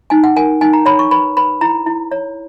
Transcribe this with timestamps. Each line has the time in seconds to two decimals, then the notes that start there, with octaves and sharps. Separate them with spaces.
0.10 D#4 G#5
0.24 F#5
0.36 A#4 G#5
0.61 D#4 G#5
0.73 A#5
0.86 C#5 B5
0.99 C#6
1.11 B4 B5
1.37 B4 B5
1.61 E4 A#5
1.86 E4
2.11 C#5